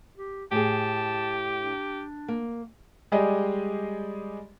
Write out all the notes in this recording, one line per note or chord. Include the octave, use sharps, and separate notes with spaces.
G4
A2 G4 G#4 A5
D4
A#3
G3 G#3 G4 G#4 D5 D#5